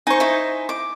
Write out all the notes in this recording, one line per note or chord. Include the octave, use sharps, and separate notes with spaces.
D#4 C5 G#5 C#6
D#4 E4
D6